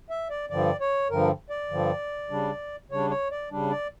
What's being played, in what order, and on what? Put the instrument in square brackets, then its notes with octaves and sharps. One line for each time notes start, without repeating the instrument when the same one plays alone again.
[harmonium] E5
D5
G2 D3 F3 D5
C#5
G2 D3 F3 A#4
D5
G2 D3 F3
C#3 G3 D4
C#3 G3 D4 C#5
C#5
D5
C#3 G3 D4
D5